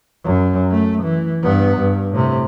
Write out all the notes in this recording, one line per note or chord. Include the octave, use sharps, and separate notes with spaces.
F#2
A3
E3
G2 B3
G2
A2 C3